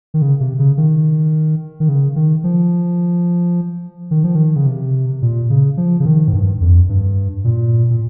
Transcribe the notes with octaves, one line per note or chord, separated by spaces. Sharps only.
D#3
C#3
C3
C#3
D#3
D#3
C#3
D#3
F3
D#3
F3
D#3
C#3
C3
A#2
C#3
F3
C#3
D#3
G#2
G2
F2
G2
A#2
A#2